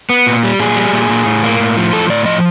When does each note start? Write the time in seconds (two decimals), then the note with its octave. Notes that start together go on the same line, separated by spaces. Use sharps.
0.10 B3
0.27 A#2
0.43 G3
0.60 A#2 G#4
0.76 G3
0.93 A#2
1.09 A#2
1.26 A2
1.43 A#3
1.60 A2
1.77 F3
1.93 A2 A4
2.09 A2 D5
2.25 F3 D#5